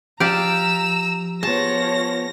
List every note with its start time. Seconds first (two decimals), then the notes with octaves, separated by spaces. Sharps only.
0.20 F3 G4 D5 F5 A#5 E6
1.43 F3 B3 G#4 C#5 A5 A#6